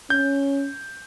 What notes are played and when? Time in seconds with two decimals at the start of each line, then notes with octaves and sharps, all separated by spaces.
0.10 C#4 G6